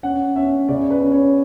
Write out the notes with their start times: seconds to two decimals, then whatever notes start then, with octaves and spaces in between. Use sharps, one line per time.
0.03 C#4 F#5
0.36 C#4 E5
0.69 C#3 D5
0.90 B4
1.01 C#4
1.12 C#5